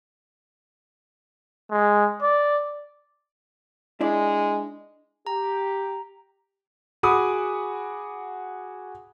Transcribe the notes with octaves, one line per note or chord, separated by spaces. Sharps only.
G#3
D5
G#3 D4 E4 D5
G4 A#5
F#4 G#4 F#5 B5 D6 D#6